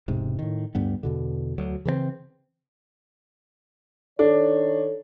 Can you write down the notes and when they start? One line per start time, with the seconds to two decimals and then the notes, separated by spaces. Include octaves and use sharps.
0.08 E1 G#2 C3
0.39 A2 D#3
0.75 D2 G2 G3 B3
1.03 E2 B2 D3
1.58 D2 F#3
1.85 C#3 E3 A#3 C4
4.19 D#3 D4 A4 C#5